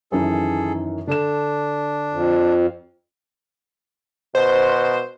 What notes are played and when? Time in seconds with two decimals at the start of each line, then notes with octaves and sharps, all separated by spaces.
0.12 F#2 D#3 E3 G#4 A4
1.07 D3 D4 A4 E7
2.13 F2
4.35 B2 C5